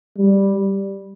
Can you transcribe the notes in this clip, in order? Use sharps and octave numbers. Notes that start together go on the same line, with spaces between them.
G3